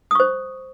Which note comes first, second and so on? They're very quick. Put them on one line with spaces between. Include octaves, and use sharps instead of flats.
D#6 C#6 C5